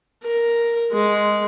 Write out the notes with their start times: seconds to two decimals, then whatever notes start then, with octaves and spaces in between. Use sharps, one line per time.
0.23 A#4
0.92 G#3